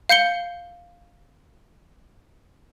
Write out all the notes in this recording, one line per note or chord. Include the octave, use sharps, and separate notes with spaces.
F5 G6 C#7 G7